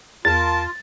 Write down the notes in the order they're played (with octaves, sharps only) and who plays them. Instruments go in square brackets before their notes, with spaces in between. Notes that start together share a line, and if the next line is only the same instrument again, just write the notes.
[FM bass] E2 [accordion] F4 [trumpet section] A#4 A5 [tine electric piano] A6